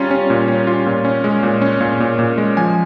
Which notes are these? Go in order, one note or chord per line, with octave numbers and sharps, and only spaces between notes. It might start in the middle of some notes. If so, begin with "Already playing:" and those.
Already playing: G3 C#4 F4 A#5
C#4
A#2
C#4
F4
A#2
C#4
G#3
A#2
C#4
A#2
A#2
A#2
G#3
F3 G#5